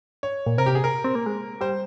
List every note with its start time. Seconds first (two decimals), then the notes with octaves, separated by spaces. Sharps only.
0.23 C#5
0.46 A#2
0.58 C3 A#4
0.66 G4
0.75 G#4
0.84 A#4
1.04 C4
1.15 A#3
1.26 G#3
1.61 G3 C5